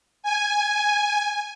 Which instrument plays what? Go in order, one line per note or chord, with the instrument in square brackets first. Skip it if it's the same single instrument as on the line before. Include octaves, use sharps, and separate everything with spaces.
[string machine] G#5